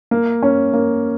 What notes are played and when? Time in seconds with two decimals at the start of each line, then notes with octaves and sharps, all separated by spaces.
0.11 A#3
0.43 C#4
0.74 A#3